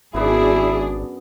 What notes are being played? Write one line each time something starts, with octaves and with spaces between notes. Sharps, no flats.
G#1 F#2 B3 D4 E4 G#4